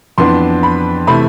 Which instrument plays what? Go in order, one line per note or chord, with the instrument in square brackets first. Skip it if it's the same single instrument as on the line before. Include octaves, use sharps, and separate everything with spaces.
[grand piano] F2 E3 B3 D4 C6
B5
C3 E3 A3 B5